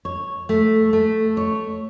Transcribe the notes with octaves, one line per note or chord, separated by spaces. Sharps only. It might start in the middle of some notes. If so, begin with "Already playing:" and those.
C#5
A3
A3
C#5